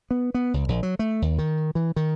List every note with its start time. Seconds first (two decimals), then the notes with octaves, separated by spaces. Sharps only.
0.11 B3
0.34 B3
0.54 C#2
0.68 A#1
0.83 F#3
0.99 A3
1.22 D#2
1.38 D#3
1.75 E3
1.96 D#3